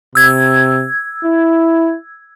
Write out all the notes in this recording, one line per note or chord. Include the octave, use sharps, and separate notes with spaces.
C3 E6 G#6
E4